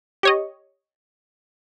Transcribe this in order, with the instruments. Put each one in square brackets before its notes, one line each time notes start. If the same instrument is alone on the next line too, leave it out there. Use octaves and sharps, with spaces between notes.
[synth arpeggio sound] G4 C#5 D#5